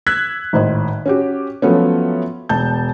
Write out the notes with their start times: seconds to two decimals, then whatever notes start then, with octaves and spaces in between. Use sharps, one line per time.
0.07 E6 F#6 G#6 B6
0.53 G#1 A2 C5 D#5
1.06 C#4 F#4 G4
1.62 F3 F#3 A3 B3 C#4
2.49 E1 A5 G6